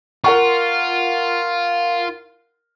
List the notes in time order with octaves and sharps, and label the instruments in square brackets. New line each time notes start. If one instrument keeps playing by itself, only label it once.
[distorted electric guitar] F4 [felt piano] A#4 F#5 C#6